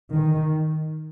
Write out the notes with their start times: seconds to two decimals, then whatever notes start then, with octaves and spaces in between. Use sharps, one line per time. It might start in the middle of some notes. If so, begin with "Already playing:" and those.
0.11 D#3